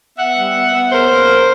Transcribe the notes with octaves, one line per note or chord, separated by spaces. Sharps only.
B3 E5 F#5
G3
B3
B3
C#3 A#4 C5
A#3
C#3